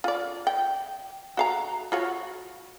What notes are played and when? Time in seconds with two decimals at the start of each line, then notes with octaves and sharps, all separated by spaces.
0.04 F4 D5
0.47 G5
1.37 F#4 F5 A#5
1.92 F4 F#4 C#5